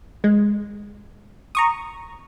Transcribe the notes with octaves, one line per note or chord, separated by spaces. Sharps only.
G#3
A#5 C#6 D#6